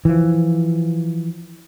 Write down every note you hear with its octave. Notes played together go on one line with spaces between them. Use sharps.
E3 F3